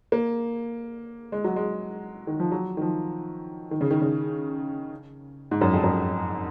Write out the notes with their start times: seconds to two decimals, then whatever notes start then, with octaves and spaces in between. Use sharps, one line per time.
0.12 A#3
1.32 G#3
1.44 F#3
1.56 G#3
2.27 D#3
2.40 F3
2.52 F#3
2.77 D#3
2.82 F3
3.71 D#3
3.81 C#3
3.91 D#3
4.02 C#3
5.51 G#2
5.61 F#2
5.73 F2
5.84 F#2